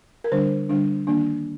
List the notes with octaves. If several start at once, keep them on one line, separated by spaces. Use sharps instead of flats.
A#4
D3 G3 D4 C5
D3 G3 D4
D#3 A#3 D4